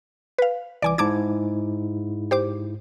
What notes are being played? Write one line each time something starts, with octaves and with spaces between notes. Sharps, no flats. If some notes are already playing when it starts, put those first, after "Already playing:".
B4 F5
C2 E3 D5 G#5 D6
G#2 E4 A5 D6 G#6
G4 C5 D6